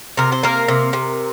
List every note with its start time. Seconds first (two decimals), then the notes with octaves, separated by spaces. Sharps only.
0.17 C3 A#4
0.32 C5
0.43 A#3 A#4
0.68 C3
0.93 C3